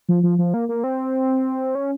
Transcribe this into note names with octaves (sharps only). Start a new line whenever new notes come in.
F3
F3
F3
A#3
A#3
C4
C#4